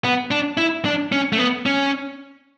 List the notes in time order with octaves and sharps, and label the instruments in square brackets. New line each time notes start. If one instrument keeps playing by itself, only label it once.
[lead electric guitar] B3
D4
E4
D4
C#4
A3
B3
C#4